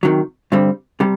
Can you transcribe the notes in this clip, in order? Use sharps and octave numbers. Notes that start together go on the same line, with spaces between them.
C3 D#3 F#3
G2 D3 G3 C4
C3 G3